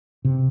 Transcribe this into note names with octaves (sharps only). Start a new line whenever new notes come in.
C3